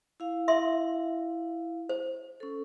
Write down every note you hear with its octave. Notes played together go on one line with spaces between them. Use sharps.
E4 F5
E5 C6
C5
C#4 A4